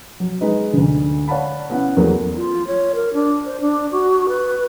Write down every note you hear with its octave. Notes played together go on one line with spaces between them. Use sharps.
F#3
G#3 D#4 B4 D#5
D2 D3
C#5 D5 F5 F#5 A5 B5
B3 C#4 E4 F#5
E2 E3 F#3 A3 A#3
F4
C#5
A#4
D4
C5
D4
F#4
B4